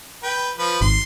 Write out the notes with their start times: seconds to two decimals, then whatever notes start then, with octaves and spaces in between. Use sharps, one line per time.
0.23 B4 G5
0.58 F3 B4
0.81 G#1 C6